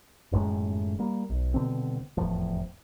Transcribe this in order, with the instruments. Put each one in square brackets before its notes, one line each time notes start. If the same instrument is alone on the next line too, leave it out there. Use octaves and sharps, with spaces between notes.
[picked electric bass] D#1 F#2 A2 G#3
G3 A#3
B1
D#1 B2 D3 C4
F1 E2 A2 F3